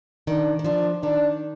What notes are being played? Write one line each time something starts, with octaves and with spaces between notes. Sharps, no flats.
D#3 D4
D#3
D3 F3 D4
D#3 D4